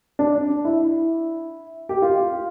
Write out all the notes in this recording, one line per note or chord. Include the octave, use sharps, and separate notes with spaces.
D4
E4
G4
F4